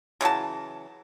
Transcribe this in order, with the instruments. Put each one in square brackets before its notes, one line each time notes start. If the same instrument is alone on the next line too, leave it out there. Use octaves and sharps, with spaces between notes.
[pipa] C#3 E3 F#3 A5